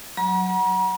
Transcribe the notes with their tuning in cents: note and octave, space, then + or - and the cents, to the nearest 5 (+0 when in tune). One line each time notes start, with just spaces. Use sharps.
F#3 +0 A#5 +45